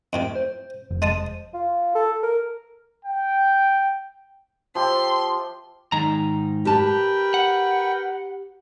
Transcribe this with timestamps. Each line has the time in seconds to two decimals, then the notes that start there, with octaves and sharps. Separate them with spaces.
0.13 F2 A2 C3 D7
0.35 C5
0.91 F1
1.02 G#3 A5 D#6
1.54 F4
1.95 A4
2.23 A#4
3.05 G5
4.75 F3 G4 E5 C6
5.92 G#2 D#3 A#5
6.65 G4 A#4 B4 G5 A5
7.34 F#5